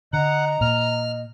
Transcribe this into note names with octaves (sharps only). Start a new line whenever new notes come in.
D3 D#5 F#5 A#5
A#2 F6